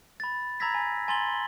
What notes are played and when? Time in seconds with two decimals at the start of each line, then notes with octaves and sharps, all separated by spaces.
0.20 B5 A6
0.60 A#5 B5 E6 G#6 A#6 B6
0.74 G#5
1.08 G#5 A#5 C6 A6 F#7 G7